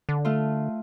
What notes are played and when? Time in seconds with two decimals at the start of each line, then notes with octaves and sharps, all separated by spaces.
0.09 D3
0.25 A3 F4